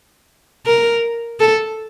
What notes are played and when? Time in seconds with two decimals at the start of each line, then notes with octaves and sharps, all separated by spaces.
0.66 A#4
1.40 A4